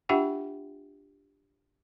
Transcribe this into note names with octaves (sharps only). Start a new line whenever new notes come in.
D4 F4 G4 E5 F#5 G5